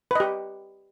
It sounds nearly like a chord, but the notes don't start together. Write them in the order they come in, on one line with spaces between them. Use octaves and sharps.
B4 D#5 G4